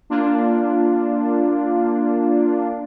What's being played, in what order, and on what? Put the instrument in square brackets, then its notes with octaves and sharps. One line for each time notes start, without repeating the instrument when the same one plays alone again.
[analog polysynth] A#3 D4 F4